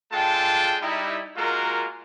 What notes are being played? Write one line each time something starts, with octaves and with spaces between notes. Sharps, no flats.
G#3 D4 F4 A4 G5 A5
G3 D#4 E4
G#3 A#3 F4 F#4 A#4